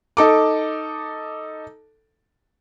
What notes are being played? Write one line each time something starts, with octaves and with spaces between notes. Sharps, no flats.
D#4 A4 D6